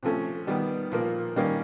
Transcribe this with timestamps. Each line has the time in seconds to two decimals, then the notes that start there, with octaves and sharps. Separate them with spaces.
0.03 C3 F3 A3 C#4
0.47 D#3 G3 B3
0.92 A#2 F3 A#3
1.36 D#3 G3 A#3 C#4